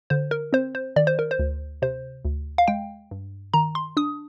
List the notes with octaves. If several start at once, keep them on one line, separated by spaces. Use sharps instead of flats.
D3 C5
A#4
C4 C5
C5
D#3 D5
C5
A#4
C5
D2
C3 C5
D2
F5
G#3 G5
G2
D#3 A#5
C6
D4 D#6